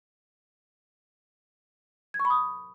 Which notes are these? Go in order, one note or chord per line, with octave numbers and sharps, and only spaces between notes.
G#6
C#6
B5
D#6